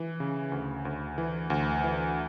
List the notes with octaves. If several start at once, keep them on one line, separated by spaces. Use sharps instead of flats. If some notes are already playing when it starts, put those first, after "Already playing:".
Already playing: E3
C#3
D2
D2
E3
D2
E3